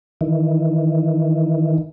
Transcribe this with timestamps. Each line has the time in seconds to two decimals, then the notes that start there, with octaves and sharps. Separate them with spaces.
0.21 D#3 E3